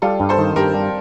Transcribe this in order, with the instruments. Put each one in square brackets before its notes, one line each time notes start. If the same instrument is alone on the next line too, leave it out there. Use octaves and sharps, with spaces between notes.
[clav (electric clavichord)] G3 [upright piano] F4 A4
[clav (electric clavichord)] G2
[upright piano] A4 C5
[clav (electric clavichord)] D#3
[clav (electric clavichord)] G2 [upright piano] G4 A#4
[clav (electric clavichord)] G3